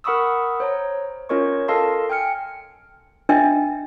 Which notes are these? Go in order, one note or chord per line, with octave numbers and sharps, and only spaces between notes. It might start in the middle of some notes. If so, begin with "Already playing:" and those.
A#4 F#5 B5 C#6 D#6 E6
C5 C#5 A#5
C#4 F4 A#4 C#5 D#5 C#6
A4 A#4 D#5 F5 A5 C6
G5 G#5 F6 C#7
D4 D#5 E5 G5